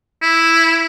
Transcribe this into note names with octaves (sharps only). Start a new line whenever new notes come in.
E4